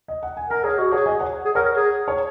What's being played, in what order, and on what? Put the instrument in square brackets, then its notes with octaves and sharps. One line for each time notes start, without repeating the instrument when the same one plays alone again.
[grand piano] D#5
F#5
G#5
[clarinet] A#4 [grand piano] F#5 A#5
[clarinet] G#4 [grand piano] C#5
[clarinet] F#4 [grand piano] D#5
[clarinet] G#4 [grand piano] C#5 F#5
[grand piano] D#5 G#5
C#5 F#5
[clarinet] G#4
[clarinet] A#4 [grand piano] C#5 F#5
[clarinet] A#4
G#4
[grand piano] C#5